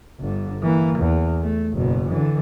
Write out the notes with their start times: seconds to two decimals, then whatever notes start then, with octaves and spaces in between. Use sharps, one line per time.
0.20 G1 D3
0.63 E3 A#3
0.99 E2
1.42 A3
1.73 F#1 B2
2.09 D3 E3